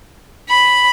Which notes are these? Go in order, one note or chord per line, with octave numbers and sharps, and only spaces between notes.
B5